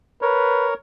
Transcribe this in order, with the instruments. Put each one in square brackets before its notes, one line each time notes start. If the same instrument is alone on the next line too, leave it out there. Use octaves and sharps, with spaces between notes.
[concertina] A#4 C#5 [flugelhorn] B4